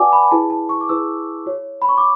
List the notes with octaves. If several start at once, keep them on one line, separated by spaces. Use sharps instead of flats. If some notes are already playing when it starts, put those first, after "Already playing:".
Already playing: F#4 B4 D5 F#5 G#5 A5 D6
B5
E4 G#4 B4 A5
A5
C#6
D6
E4 G#4 B4 E6
F#4 C#5
B5
C#6
D6